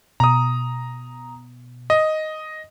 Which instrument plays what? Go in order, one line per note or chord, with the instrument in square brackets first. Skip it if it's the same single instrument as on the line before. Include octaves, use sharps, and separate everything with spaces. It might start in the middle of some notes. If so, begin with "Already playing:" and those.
[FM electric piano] B2 [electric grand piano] A#5 D#6
[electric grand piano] D#5